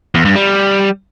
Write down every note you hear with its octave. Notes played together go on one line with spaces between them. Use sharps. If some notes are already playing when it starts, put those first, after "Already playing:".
E2
G2
G3